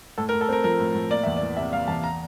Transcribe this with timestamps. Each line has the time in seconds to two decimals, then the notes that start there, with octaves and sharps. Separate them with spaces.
0.18 A2 A4
0.29 A#4
0.33 A2
0.41 A4
0.49 C4 A#4
0.64 F3 A#4
0.80 A2
0.95 A2
1.11 A#3 D5
1.23 E2 E5
1.37 D5
1.42 E3
1.57 C3 E5
1.73 A#3 F5
1.88 E2 A5
2.04 A#5